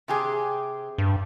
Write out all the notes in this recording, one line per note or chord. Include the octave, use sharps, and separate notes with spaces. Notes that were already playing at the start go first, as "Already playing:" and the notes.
C3 G4 G#4
G2